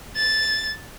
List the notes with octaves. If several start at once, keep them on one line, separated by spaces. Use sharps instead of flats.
A6